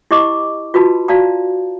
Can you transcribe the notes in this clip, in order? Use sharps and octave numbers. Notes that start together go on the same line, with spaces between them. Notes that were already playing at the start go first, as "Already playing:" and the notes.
E4 G4 D#5 D6
F4 F#4 B4 A5 B5
F#4 D5 F5 A5 A#5